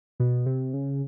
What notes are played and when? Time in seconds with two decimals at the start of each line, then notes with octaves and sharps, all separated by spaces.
0.20 B2
0.46 C3
0.74 C#3